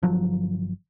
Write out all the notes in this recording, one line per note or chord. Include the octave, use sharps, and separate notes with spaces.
G1 F3 F#3